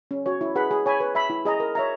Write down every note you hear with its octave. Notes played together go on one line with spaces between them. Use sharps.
C#4
F#4 C#5
E4
G#4 B4 F#5 B5
G#4
C#5 G#5 B5
B4
E5 B5
E4
G#4 D#5 A#5
A#4
C#5 E5 A#5